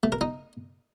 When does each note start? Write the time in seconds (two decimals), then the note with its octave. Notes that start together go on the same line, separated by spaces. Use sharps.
0.03 A3
0.12 A#4
0.21 D#4